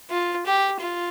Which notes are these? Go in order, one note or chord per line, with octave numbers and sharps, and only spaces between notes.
F4
G4
F4